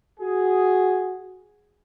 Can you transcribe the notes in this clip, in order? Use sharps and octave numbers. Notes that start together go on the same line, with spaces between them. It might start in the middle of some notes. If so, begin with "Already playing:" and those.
F#4 G#4